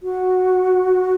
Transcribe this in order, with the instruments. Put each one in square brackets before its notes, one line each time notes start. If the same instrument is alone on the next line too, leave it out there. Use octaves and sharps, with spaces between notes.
[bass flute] F#4